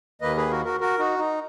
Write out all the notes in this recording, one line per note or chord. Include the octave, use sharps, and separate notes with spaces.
D#2 D#3 A#3 B4 D#5
G#4 B4
F#4 A#4
F#4 A#4
F#4 A#4
D#4 F#4
D#4